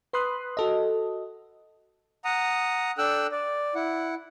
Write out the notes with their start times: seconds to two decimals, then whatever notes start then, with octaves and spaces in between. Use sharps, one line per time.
0.13 B4 B5 C6 D#6 F#6
0.57 F#4 A4 D#5
2.25 F#5 A#5 D#6
2.98 D4 A4 G5 E6 F#6
3.32 D5
3.75 E4 F#5